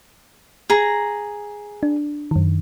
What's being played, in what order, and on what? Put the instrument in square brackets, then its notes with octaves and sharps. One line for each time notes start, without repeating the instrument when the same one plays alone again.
[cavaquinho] G#4 A#5
[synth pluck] D4
F#2 D#3